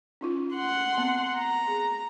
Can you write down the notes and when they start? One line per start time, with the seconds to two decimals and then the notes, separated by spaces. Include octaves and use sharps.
0.21 C#4 D#4 F4
0.55 F#5 C6
0.98 B3 C4
1.37 A#5
1.67 G#4